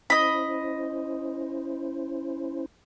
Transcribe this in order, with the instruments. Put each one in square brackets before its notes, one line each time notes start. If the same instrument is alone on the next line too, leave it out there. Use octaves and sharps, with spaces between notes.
[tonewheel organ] C#4 E4 C5 [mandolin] D#5 B5